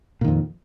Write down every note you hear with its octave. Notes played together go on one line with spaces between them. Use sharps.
F2 A#2 D#3